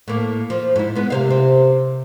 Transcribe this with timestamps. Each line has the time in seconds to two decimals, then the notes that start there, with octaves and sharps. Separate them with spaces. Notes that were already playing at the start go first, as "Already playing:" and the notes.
0.08 A2 A#3
0.50 F3
0.76 G#2 E4
0.95 G#3 B3
1.10 C3 A#4 C5 F5
1.30 C4